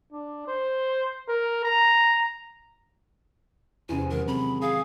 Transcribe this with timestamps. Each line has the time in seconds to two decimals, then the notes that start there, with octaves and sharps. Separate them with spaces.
0.13 D4
0.48 C5
1.28 A#4
1.64 A#5
3.89 E2 C3 C#4 E4 G#5
4.10 D#3 F#3 G#3 A#4
4.28 C4 B5
4.61 G#4 F5